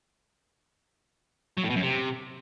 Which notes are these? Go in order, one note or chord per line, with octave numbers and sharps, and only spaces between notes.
F#3
A2
B2
F#2
C3